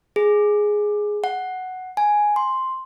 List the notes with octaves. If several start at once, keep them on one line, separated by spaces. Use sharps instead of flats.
G#4
F#5
G#5
C6